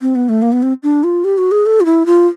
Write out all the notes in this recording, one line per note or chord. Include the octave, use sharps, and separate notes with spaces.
C4
B3
A3
A#3
B3
C4
D4
F4
G4
F#4
G#4
A4
F4
E4
F4